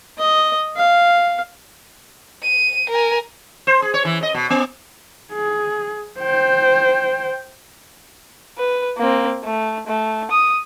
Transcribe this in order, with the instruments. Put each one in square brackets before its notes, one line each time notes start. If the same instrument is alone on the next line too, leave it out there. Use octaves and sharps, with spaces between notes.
[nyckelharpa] D#5
F5
[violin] D#7
A#4 G#5
[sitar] C5
G#4
C#5
E3
D#5
B2
B3
[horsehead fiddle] G#4
C5 G5
[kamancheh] B4
A#3 C4
A3
A3
D#6